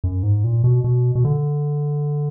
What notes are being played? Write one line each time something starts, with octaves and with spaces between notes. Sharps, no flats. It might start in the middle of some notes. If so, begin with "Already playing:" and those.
F#2
G#2
A#2
B2
B2
B2
D3